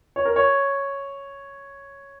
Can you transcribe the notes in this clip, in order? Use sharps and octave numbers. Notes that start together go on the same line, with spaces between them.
C#5
A#4
C#5